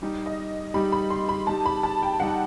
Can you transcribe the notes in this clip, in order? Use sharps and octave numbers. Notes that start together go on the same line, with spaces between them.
G3 D#4 G4
D#5
G3 D#4 G4 B5
B5
C6
B5
G3 D#4 G4 A5
B5
A5
G5
G3 D#4 G4 F#5